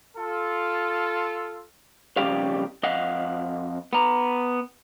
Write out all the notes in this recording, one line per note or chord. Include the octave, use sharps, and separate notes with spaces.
F4 A4
B1 F2 C#3 G3 G4 F5
F2 D#5 F5 F#5
B3 A#5